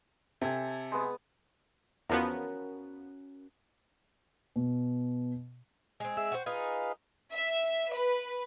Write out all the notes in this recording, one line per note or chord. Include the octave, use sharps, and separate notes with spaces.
C3 A4 G#5
G#3 B3
E2 F3 B3 C#4 F#4 A#4
B2
G#3 C4
G#4 E5 E6
F#4 C5
D#4 F4 G#4 B4 F5
E5
B4